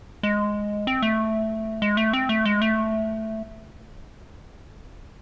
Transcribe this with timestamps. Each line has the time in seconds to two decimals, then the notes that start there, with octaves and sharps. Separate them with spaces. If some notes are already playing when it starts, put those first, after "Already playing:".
0.23 G#3
0.87 C4
1.02 A3
1.82 G#3
1.97 A3
2.13 C4
2.29 A3
2.45 G#3
2.62 A3